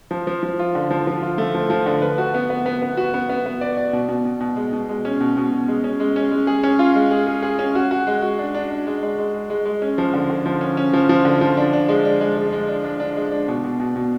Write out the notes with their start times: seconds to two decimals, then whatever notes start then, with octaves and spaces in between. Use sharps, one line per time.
0.11 F3
0.27 F3
0.43 F3
0.59 F4
0.75 D3
0.91 F3
1.07 F3
1.22 F4
1.38 A3
1.55 F3
1.70 F3
1.86 D3
2.02 B4
2.18 F#4
2.34 B3
2.50 B3
2.66 B3
2.82 B3
2.97 F#4
3.14 B3
3.29 B3
3.46 B3
3.61 D5
3.77 D5
3.93 B2
4.08 B2
4.25 B2
4.41 B2
4.56 G#3
4.73 B2
4.89 G#3
5.05 C#4
5.21 B2
5.37 B2
5.52 B2
5.68 G#3
5.84 C#4
6.00 G#3
6.16 C#4
6.32 G#3
6.47 G#4
6.63 C#4
6.79 F4
6.95 G#3
7.11 G#4
7.27 G#4
7.43 G#4
7.59 C#4
7.75 F#4
7.91 F#4
8.07 G#3
8.22 F#4
8.39 D4
8.54 D4
8.70 D4
8.87 G#3
9.03 G#3
9.19 G#3
9.34 G#3
9.50 G#3
9.66 G#3
9.82 C#4
9.98 F3
10.14 D3
10.30 D3
10.46 F3
10.61 C#4
10.77 C#4
10.93 F3
11.09 F3
11.25 D3
11.41 F3
11.57 D4
11.73 D4
11.89 G#3
12.05 D4
12.21 G#3
12.36 G#3
12.52 G#3
12.68 D4
12.84 D4
13.00 D4
13.16 G#3
13.31 D4
13.48 B2
13.64 B2
13.80 B2
13.96 B2